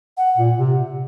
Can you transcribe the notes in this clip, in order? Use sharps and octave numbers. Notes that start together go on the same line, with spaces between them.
F#5
A#2
C3